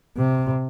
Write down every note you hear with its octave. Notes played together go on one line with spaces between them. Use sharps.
C3